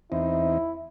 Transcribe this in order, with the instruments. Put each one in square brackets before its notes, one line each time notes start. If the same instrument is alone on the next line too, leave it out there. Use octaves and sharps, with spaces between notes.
[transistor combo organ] E2 C4 D#4 [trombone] E4